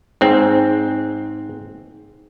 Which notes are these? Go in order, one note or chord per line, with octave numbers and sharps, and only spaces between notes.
G#2 C4